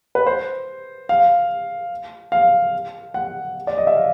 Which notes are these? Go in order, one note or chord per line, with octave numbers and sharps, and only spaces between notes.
B4
C5
F5
F5
F#5
D5
D#5
E5
F5